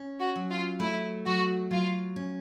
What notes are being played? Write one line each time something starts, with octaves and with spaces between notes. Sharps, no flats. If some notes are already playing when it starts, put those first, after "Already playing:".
Already playing: C#4
F#4
F#3
F4
A3 E4
F#3 F#4
F#3 F4
C#4